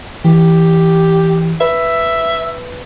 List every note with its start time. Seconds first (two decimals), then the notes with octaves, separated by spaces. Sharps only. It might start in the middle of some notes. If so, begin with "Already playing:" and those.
0.25 E3 G4
1.61 B4 E5